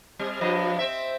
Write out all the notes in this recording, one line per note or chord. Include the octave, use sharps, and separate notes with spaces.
G3 C4
G2 F3 D#5
C4 E5